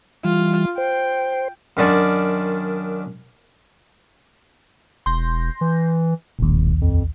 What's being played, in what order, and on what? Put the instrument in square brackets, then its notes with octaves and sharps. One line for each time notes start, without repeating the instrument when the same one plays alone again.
[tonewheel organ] E3 G3 [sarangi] F4
[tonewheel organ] C5 [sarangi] G5
[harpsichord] F#2 D#3 D4 D5 C#6
[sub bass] E1 [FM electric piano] C6 G6 A#6
[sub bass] E3
[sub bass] E1 [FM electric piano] A#1 D#2
[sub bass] F2